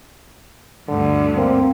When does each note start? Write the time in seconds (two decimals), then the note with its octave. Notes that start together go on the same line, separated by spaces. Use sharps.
0.88 D2 G2 D3
1.37 A#3 C4